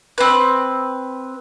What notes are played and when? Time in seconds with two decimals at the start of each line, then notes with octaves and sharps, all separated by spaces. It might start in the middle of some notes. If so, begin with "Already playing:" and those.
0.18 C4 B4